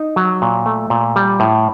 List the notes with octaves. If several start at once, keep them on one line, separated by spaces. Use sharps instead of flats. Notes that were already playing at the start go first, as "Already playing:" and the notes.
Already playing: D#4
F#3
A#2
A3
A#2
G3
A2